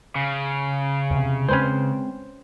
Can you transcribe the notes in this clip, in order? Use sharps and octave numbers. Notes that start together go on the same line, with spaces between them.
C#3
E2 C3
G#3 C4 C#4 B4 C5